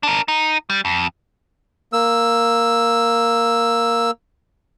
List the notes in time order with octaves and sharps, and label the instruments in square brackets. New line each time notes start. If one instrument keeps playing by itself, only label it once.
[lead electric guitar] D4 A#4
D#4
G3
F2
[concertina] A#3 E6